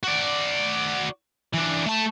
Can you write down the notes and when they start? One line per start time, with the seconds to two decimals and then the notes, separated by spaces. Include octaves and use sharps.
0.03 F#4 D5
1.54 E3 D4
1.86 A3 A5